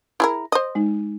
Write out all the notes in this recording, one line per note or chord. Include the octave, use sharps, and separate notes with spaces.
E4 G#4 A#4
C5 D#5
G#3 D#4